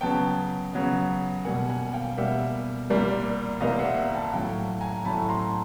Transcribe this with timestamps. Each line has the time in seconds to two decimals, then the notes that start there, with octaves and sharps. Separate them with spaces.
0.01 C#3 F#3 B3 G5 A5
0.73 C#3 F#3 B3
1.45 B2 G3 A#3 F#5 G#5
1.70 F#5 G#5
1.93 F5 G5
2.17 B2 G3 A#3 E5 F#5
2.90 C2 A#2 G3 A#3
3.61 C2 A#2 G3 A#3 D#5 F5
3.79 E5 F#5
4.15 G5 A5
4.33 A2 F#3 A3 F5 G5
4.81 G#5 A#5
5.05 A2 F#3 A3 A5 B5
5.29 A#5 C6